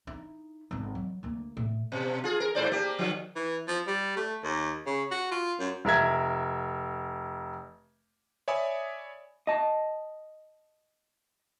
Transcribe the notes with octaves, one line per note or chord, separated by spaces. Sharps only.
D#4 E4
G#1 G#3
F#3
D2 A#3
A2
B2
F4 G#4
A#4
G#2 C5 D5
A#3 G4
D#3 F3
E3
F3
G3
A3
D#2
C#3
F#4
F4
F#2
F1 A#4 E5 G#6
C#5 D5 E5 G#5 B5 D#6
D#5 A5